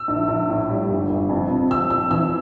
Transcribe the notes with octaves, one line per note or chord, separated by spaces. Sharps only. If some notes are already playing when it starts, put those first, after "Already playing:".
Already playing: E6
A#1
A#1
A2
G3
G1
G1
F2
C3
F2 E6
F2 E6
E3 E6